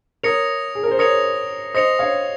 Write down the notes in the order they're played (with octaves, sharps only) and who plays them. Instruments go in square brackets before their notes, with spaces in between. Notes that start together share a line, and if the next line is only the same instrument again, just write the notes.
[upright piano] A#4 C#5 [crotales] D#6 A#6 C#7 F7
[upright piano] G#4
A#4
C5
[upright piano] A#4 C#5 [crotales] D#6 A#6 C#7 F7
[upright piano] C5 D#5 [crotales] D#6 A#6 C#7 F7
[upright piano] C#5 F5